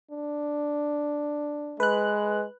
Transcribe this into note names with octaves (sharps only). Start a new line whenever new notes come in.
D4
G#3 B4 F#6